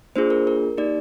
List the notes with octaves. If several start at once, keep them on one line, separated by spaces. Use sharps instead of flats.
A#3 D4 F4 G#4 C5
A#4
A#4
A#3 D#4 G4 D5